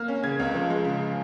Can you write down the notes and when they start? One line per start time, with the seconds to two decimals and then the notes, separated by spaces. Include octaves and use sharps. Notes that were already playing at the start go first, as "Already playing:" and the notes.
Already playing: A#3 F6
0.08 C#4
0.23 C#3 G#6
0.39 C#2
0.55 F3
0.70 G#3
0.85 C#3